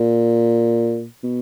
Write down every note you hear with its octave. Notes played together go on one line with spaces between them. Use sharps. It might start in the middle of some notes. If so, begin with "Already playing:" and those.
Already playing: A#2
B2